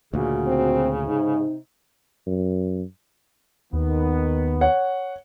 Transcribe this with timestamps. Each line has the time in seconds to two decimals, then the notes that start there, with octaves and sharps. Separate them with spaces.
0.13 D2 A#2 C#3 F#4
0.47 C4
1.06 G#2 C3 D#4
2.27 F#2
3.73 D#2 D#3 B3
4.61 C#5 F#5